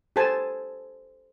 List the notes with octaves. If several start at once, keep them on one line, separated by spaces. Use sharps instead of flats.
G4 A4 C5 G#5 A5